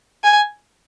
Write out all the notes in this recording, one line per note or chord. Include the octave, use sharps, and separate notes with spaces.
G#5